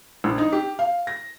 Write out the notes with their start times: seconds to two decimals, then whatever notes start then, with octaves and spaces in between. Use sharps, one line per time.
0.24 A#1
0.38 D#4
0.52 G4
0.79 F5
1.07 A#6